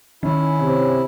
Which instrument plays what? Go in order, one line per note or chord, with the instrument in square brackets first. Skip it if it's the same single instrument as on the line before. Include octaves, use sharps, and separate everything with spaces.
[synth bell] D#3 [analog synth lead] C#4 [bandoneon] E4
[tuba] C3